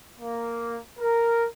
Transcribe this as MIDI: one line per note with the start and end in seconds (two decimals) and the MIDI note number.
0.20 0.80 58
0.99 1.46 70